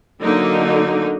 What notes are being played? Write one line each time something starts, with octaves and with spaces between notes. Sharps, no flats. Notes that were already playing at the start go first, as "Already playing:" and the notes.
D3 F#3 A#3 D#4